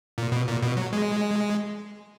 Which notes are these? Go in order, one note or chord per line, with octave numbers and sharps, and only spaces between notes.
A#2
B2
A#2
B2
F#3
G#3